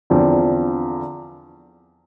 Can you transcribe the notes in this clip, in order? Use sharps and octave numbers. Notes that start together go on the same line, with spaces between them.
E2 D3 F3 C4 F4